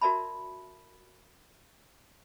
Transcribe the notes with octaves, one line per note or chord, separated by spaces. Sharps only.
F#4 A#4 D5 E5 A5 B5